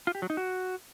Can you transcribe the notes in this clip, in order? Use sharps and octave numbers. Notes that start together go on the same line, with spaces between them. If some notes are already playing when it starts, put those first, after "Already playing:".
F4
G4
F#3
D#4
F#4